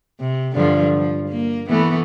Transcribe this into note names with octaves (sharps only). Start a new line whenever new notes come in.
C3
G2 D3 F3
F3
A#3
E3 A3 B3